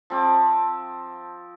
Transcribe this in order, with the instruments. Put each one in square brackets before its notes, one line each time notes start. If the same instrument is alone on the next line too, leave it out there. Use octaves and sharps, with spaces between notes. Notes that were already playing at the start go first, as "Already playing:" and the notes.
[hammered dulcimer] F3 C4 D6